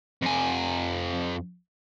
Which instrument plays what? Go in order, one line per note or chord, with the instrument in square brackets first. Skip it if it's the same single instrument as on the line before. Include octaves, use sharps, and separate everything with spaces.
[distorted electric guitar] F2 G#5